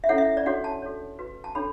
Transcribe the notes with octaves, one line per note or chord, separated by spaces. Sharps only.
E5
C#4 E4 A4 C#5 F#5
E5
D5
D4 F#4 A4 C#5 F#5
A5
F#4 A4 C#5
F#4 B4
A5
D4 A4 C#5 B5